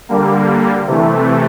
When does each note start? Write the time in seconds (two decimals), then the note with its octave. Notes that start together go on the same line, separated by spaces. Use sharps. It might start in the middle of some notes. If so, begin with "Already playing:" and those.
0.09 D3 G3 A#3
0.87 C3 E3 A3